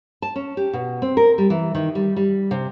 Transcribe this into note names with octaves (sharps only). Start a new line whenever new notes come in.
A5
C#4
G4
B2
C4
A#4
G3
E3
D#3
G3
G3
C3